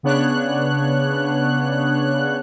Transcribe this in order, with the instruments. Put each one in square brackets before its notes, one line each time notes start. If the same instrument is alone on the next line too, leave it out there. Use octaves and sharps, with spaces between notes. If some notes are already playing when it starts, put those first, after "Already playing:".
[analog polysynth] C#3 B3 D4 C#5 F#6